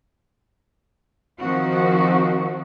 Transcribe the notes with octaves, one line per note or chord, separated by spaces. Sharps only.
D#3 F3 C4 F#4